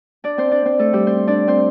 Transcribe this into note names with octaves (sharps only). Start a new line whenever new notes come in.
D4 D5
C4 C5
D4 D5
C4 C5
A3 A4
G3 G4
C4 C5
D4 D5
C4 C5